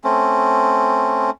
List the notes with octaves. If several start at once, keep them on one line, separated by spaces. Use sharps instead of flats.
A3 C4 C#4